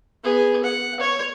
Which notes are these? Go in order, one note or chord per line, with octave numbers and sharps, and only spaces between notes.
B3 G#4
F#5
C#5